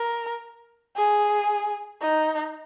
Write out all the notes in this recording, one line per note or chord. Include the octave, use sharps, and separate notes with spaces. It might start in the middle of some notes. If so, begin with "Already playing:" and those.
Already playing: A#4
G#4
D#4